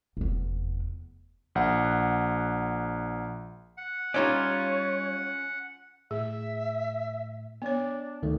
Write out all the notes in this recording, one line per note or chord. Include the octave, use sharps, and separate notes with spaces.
F1 E2
A#1 F#5
F#5
G3 C#4 D#4 F4 C#5 D5
A2 G#4 E5
B3 D4 C#5
D2 D#3 A3